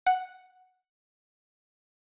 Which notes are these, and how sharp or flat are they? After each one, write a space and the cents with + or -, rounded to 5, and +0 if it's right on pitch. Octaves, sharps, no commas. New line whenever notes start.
F#5 +0